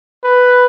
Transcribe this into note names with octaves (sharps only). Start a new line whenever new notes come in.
B4